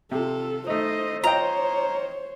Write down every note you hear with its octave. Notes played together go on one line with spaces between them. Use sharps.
C3 F4 A4
A3 D#4 C5 D#5
F4 C5 C#5 D#5 G5 A#5